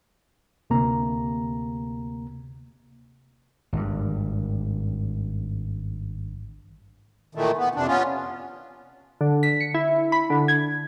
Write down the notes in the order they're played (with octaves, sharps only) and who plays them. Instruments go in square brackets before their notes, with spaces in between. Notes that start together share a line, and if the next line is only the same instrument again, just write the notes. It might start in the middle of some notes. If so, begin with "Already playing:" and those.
[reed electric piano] D2 C3 A#3 A#5
[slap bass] G#1 G2
[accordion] A#2 D#3 E3 A3
B3
F2 C3 D4
B3 C#4 F4
[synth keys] D3
B6
C#7
E4
B5
D3
G#6